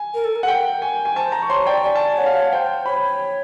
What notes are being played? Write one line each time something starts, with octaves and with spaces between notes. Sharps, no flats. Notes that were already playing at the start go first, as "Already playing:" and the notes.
Already playing: G#5
A#4
A4
A#4
F#5
G5
G#5
G#5
C5 A5
A#5
C#6
C#5 C6
D5 G5
D5 G#5
A5
G#5
C#5 F#5
F5
F#5
C5 G5
C#5 B5